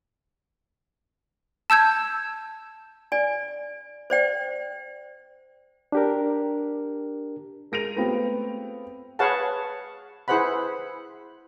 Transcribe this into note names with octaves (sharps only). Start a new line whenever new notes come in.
A5 E6 G6 G#6
D5 G#5
C5 D5 G5
D4 G4 A#4
G#3 A#4 A#6 D7 D#7 F7
A3 B3 C4 F4 G4
G#4 B4 C#5 F5 F#5 A5
E4 G#4 B4 C5 F#5 B5